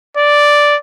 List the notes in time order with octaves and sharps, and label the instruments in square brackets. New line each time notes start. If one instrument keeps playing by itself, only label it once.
[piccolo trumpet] D5